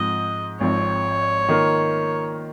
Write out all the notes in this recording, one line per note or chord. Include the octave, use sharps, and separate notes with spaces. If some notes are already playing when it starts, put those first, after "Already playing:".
Already playing: G#2 F3 C4 D#5
G#1 G#2 F3 C4 C#5
D#3 A#3 F4